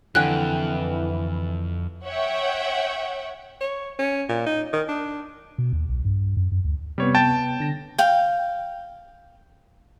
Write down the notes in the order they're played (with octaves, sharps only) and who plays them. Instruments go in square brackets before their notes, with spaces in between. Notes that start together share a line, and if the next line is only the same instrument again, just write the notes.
[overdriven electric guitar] F2 [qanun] D3 G5 G#5 [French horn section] E3 [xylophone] F#6
[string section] C#5 E5 F#5 G5
[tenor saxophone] C#5
C#4
A#2
D#4
D#3
D4
[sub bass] B2
D#2
B1
G2
F#2
F#2
D2
[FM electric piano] C3 B3 [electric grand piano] G3 C#5
[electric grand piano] G5 A5 A6
[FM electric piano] D3 A#6
[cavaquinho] F5 G5